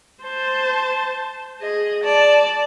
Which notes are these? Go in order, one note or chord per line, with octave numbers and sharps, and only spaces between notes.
C5 A5
G#4 D#5
D5 A5